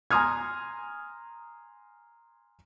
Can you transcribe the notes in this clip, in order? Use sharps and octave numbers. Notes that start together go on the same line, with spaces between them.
G#5 A#5 C6 D#6 F6 G#6